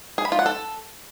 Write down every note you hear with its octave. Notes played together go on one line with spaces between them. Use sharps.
G#4
B5
F4
F#5
A4